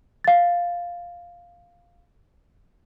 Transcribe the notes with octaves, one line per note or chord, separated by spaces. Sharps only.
F5 A6